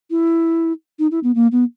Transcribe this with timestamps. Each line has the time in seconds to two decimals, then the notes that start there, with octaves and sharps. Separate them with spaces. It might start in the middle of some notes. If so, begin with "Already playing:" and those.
0.11 E4
0.99 D#4
1.11 E4
1.23 B3
1.35 A#3
1.52 B3